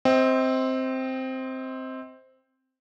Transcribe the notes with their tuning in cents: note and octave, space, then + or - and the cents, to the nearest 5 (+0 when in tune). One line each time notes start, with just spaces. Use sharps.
C4 +0 D#5 +35 G5 +0